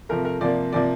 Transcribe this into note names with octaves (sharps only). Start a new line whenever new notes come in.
C3 F3 A3 A#4
A#4
C3 F3 A#3 D5
C3 F3 A#3 D5